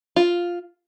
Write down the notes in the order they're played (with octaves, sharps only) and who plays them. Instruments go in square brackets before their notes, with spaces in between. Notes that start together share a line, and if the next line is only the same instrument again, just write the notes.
[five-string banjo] F4